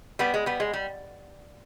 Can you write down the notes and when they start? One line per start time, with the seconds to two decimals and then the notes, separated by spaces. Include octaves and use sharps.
0.19 G3 B3
0.34 G#3
0.46 G3 B3
0.60 G#3
0.73 G3